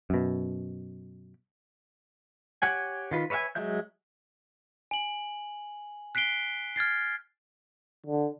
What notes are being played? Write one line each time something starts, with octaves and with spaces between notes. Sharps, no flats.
F#2 B2
G4 C#5 F#5 G#5
D#3 F4 B4
B4 C#5 E5 F5 G#5
F#3 G#3 E5 G6
G#5 F#7
F#6 B6 C7 D7 G7
F6 G#6 A6 C7
D3